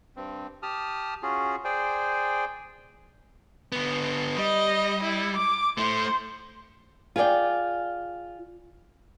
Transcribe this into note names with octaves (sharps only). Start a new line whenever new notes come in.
G2 C4
G4 A5 D#6 F6
C#4 F4 F#4 G#4
G#4 C5 D5 G5 G#5
D3 B3
G3 D#5
E4
D6
A3 E4 C5
F4 G#4 B4 D5 G5